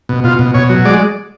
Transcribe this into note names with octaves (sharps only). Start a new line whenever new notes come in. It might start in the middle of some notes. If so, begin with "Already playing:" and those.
B2
B2 F4
B2
B2 C#5
F#3
G#3 D5